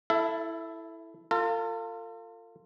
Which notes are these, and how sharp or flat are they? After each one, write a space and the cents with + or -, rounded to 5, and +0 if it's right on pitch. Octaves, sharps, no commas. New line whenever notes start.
E4 +0 A4 +0 E5 +35
F4 +0 A4 +45